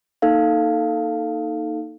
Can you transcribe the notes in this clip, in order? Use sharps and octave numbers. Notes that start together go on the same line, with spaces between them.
A#3 D#4 A4 F5